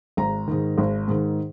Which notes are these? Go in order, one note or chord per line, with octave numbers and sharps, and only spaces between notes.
G#1 A#5
G#2 D#3
G#1
G#2 D#3